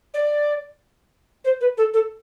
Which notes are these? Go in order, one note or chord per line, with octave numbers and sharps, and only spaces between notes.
D5
C5
B4
A4
A4